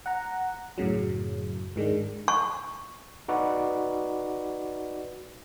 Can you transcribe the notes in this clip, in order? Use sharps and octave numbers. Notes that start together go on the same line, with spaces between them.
F#5 A#5
F#2 A2 C#3 F#3
G#2 D#3 G#3 D4
C#6
D#4 F#4 B4 D5